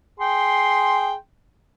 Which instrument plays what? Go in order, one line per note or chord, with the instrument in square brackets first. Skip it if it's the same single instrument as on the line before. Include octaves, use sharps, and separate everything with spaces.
[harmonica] G#4 G5 C6